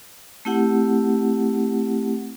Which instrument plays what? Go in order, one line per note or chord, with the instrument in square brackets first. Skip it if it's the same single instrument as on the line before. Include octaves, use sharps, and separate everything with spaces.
[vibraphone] A3 C4 E4 G4 F#5